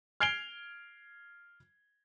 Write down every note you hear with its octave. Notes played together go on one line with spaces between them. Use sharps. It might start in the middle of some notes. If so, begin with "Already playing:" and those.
F6 G#6 C7 D7 F7 G7